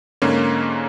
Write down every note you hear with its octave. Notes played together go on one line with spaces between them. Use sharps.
G#2 D3 A#3 C#4